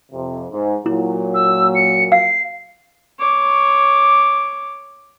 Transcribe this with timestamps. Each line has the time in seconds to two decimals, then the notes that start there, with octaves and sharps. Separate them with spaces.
0.12 F2 C3
0.51 G#2
0.86 A#2 F#3 E4
1.34 E6
1.75 C#7
2.12 F5 C7
3.19 C#5 D6